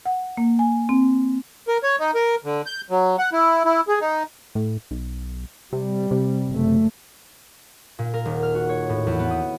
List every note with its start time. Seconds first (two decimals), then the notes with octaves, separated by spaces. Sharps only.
0.06 F#5
0.37 A#3
0.59 G#5
0.89 C4
1.68 A#4
1.83 C#5
1.99 D#4
2.15 A#4
2.45 D3
2.66 G6
2.90 F#3
3.19 F#5
3.33 E4
3.65 E4
3.88 G#4
4.01 D#4
4.55 A2
4.91 B1
5.73 C3 G3
6.11 C3
6.49 F#1 A3
7.99 A#2
8.14 A#4
8.25 D#1
8.43 F6
8.55 F#4
8.69 C#5
8.89 A2
9.07 E2
9.19 B3
9.31 D#6